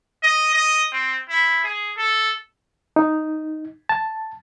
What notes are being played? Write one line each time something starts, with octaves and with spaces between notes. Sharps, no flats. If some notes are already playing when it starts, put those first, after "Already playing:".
D#5
D#5
C4
E4
G#4
A4
D#4
A5